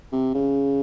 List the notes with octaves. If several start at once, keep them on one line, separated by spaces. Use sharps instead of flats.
C3
C#3